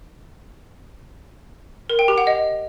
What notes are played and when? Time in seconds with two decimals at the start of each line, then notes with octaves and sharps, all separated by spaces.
1.90 A#4
1.99 G5
2.08 G4
2.18 F#5
2.27 D#5